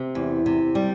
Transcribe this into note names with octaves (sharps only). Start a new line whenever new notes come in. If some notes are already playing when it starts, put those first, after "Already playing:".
Already playing: C3
E2
C3
G3